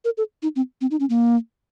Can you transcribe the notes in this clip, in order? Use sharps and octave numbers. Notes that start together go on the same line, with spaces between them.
A#4
A4
D#4
C4
C4
D#4
C#4
A#3